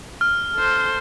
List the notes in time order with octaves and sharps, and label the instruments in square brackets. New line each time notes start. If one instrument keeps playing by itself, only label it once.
[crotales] F6
[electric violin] A4 C5